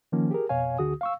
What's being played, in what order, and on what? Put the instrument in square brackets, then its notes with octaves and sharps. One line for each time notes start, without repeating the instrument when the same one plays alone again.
[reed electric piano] D#3 F3 A#3 C#4
G4 G#4 A#4
F2 B2 C#5 F5 G#5
D2 D3 F#4 G#4 D#6
F5 C#6 E6